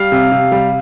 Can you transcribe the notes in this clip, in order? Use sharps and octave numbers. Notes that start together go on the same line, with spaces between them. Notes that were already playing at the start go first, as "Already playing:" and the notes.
Already playing: G3 F5
C3
C3
G3